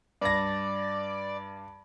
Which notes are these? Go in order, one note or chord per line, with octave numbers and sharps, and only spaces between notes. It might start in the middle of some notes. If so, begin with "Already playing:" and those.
G2 D5 A#6